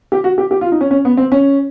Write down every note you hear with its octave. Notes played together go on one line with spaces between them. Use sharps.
G4
F#4
G4
G4
F4
D#4
C#4
C#4
B3
C4
C#4